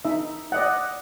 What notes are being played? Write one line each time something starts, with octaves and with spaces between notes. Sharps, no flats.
D#4 E5
D5 D#5 F#5